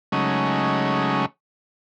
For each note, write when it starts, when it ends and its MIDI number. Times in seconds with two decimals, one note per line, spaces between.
0.12 1.26 49
0.12 1.26 54
0.12 1.26 56
0.12 1.26 57
0.12 1.26 61
0.12 1.26 63